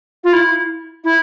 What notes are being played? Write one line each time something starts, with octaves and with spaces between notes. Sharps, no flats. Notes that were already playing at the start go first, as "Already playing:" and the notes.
F4
E4
E4